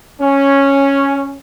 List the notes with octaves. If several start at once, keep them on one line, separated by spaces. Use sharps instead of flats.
C#4